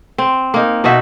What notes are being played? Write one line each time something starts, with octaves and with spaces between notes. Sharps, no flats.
C4
A#3 D#4
B2 D#4 F#4 E5